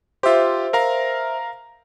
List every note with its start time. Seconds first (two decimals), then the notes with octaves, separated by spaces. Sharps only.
0.23 F4 G4 C5 E5
0.73 A#4 F5 A#5